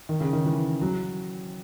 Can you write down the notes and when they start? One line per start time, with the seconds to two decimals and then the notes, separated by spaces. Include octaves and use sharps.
0.09 D#3
0.21 C#3
0.33 D#3
0.45 E3
0.81 F#3